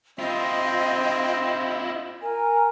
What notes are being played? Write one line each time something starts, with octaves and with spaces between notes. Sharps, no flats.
C4 E4 F4 D#5
A#4 G#5